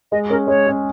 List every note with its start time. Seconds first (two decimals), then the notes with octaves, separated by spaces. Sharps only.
0.12 G#3 D#5
0.30 C#4 G#4 A#4
0.48 G#3 C#5
0.67 C#4 G#4